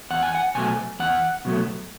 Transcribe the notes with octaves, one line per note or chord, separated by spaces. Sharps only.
E2 F#5
G#5
F#5
B2 F#3 A3 G#5
E2 F#5
B2 F#3 A3